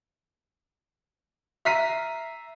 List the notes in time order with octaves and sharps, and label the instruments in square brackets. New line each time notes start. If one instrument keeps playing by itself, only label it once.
[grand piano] E5 A#5 F6 B6 C7 D#7